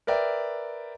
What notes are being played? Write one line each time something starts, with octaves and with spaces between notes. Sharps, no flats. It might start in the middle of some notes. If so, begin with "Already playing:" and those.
A#4 B4 D5 E5 G5